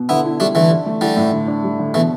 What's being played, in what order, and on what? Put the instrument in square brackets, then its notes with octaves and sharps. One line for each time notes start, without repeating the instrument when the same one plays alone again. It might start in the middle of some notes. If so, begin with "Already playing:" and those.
Already playing: [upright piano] B2
[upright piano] D3 [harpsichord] B3 E4
[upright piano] E4
[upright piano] G3 [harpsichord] A3 D4
[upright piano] D3 [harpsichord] E3 A3
[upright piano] D4
A3
[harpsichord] D3 G3 [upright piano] E3
[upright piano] A2
D3
D4
G3
D3
[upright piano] B2 [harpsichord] E3 A3